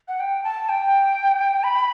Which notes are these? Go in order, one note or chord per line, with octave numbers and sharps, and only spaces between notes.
F#5
G5
A5
G5
B5